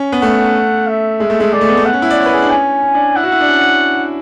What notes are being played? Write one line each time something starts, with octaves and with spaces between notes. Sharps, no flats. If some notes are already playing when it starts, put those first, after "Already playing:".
Already playing: C#4
B3
A3 F#5
E5
G#3
A3
G#3
G#3 D5
A3
B3
A3
B3 F#5
C#4
E4
D5
C#5
B4
G#4
D4
C#4 G#5
C#4
D4
E4 F#5
F#4
E4
D4
C#4